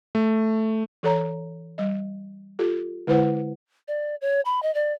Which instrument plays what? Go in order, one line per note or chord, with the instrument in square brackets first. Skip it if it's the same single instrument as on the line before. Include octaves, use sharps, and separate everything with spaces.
[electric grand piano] A3
[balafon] E3 A4 C#5 A#5
G3 D#5
F4 G4 A4
D3 G#3 E4 B4 C5 F#5
[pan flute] D5
C#5
B5
D#5
D5